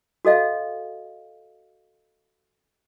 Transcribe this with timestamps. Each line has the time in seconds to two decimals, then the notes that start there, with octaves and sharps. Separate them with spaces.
0.25 F#4 A4 D#5 F5